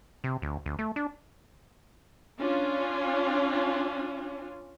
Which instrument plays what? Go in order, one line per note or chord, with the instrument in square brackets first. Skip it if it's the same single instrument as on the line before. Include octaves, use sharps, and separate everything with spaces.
[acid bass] C3
D2
D2
A3
D4
[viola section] C#4 D4 F4